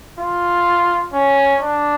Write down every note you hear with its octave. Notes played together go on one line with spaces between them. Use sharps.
F4
C#4
D4